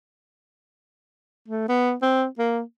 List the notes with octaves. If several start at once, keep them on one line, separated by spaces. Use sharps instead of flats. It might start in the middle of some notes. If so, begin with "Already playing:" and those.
A3
B3
C4
A#3